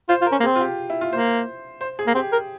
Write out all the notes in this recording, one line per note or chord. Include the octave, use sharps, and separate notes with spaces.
F4 C5
F4
A#4
C#4
A#3
C4 G#4
F4
G4
E4
F4
A#3 C5
C5
G#4
A#3
C4 G4
A#4